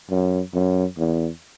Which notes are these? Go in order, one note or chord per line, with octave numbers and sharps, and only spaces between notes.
F#2
F#2
E2